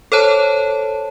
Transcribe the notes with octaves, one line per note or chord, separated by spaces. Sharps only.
A4 C5 C#5 A5